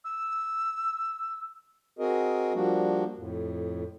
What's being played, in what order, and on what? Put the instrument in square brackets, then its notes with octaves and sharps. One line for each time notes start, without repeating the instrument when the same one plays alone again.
[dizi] E6
[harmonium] C4 F#4 G#4 A#4 D#5
F3 G3 A#3 D4 F#4
F2 A2